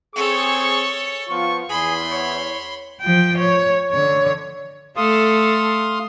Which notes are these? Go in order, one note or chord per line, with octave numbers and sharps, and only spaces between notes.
C4 G#4 A4 C#5 C#6
F3 B3 F4 C#6
E2 G#4 B5 C6
C#5
F3 G5
C#5
D3 C#5
A3 A4 F5 C6 D#6